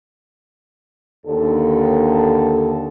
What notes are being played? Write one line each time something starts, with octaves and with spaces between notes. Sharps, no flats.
D#2 D3 A4